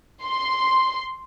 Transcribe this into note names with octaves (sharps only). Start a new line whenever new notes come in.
C6